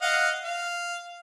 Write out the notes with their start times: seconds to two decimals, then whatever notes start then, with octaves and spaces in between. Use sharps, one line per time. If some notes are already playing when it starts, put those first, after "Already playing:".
0.02 D#5 F5 F#5
0.45 F5